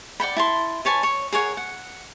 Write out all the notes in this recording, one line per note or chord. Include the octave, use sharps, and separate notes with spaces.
D5 F#5 G5 B5
E4 A5 C6
B4 C#5 G#5 A5
C#5
G#4 A#4 C#5 F#5
F#5